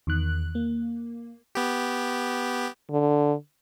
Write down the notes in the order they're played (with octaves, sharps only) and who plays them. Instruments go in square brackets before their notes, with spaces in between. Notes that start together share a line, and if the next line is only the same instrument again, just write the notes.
[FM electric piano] E2 D#3 F#6
A#3
[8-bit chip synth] B3 G4
[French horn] D3